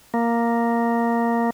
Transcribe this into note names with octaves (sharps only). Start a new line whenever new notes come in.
A#3